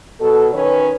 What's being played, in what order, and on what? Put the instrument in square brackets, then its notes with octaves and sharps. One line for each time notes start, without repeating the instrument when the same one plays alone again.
[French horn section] B2 F#3 A4
D#3 C#4 B4 C#5